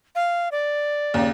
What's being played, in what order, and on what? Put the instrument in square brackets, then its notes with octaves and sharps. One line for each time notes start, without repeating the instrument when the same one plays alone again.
[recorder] F5
D5
[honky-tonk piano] D#2 C#3